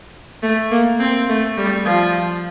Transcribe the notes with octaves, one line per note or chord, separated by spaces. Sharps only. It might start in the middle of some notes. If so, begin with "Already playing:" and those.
A3
A#3
C4
A3
G3
F3